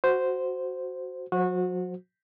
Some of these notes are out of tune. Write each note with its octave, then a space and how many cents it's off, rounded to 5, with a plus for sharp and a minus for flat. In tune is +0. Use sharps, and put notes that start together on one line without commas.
F#4 +0 C5 -5
F#3 -35 F#4 -25 C5 +15